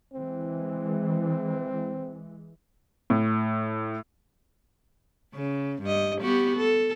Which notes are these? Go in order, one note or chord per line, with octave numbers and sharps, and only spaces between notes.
E3 G#3 C4
A2
C#3
G2 D#5
B3 F#4 G4
A4